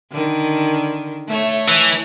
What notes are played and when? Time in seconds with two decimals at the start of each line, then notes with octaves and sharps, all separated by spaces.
0.11 D3 D#3
1.27 A3 C#5
1.68 E3